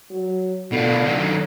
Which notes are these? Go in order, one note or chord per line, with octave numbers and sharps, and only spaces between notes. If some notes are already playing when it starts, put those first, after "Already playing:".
F#3
B2 D3 F4
D#3 F#3